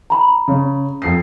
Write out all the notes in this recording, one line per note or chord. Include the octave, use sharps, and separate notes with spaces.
A#5 B5
C#3
F2 C7